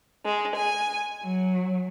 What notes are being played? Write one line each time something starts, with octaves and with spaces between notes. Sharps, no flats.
G#3
G#5
F#3